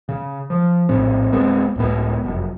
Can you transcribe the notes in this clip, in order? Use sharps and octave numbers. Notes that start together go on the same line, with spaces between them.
C#3
F3
A#1 A2 C4
D1 G#3 B3 C4
C#2 A2 B3
F1 F#2